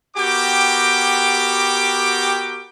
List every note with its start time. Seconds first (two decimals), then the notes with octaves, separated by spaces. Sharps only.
0.17 B3 F#4 G4 A#4 G5 D6